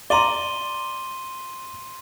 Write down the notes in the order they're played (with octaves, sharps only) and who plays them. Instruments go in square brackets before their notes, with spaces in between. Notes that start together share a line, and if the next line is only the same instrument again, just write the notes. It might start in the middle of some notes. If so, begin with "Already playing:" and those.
[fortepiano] D5 A#5 [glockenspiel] C6 D#7 G7